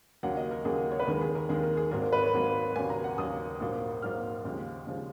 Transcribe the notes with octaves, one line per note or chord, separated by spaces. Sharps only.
D#2 C#3 F#3 A#3 F#5
D#5
A#4
D#2 C#3 F#3 A#3 G#4
C#5
B4
D#2 D#3 G#3 A#4
G#4
A#4
D#2 D#3 G#3 G#4
A#4
G#4
G#1 G#2 F#3 A#3 A#4
A#4
B4
C#5
G#1 G#2 F#3 A#3
D#2 C#3 F#3 A#3 G#5
A#5
F#5
D#2 C#3 F#3 A#3 D#6
A#1 G#2 F#3 A#3
A#1 G#2 F#3 A#3 F6
D#2 C#3 F3 G#3
D#2 C#3 F3 G#3